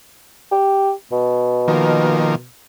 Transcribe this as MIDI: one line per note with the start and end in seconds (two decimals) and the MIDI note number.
0.52 0.92 67
1.12 2.46 47
1.68 2.35 51
1.68 2.35 53
1.68 2.35 58